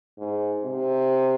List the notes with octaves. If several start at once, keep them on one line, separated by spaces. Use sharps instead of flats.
G#2
C3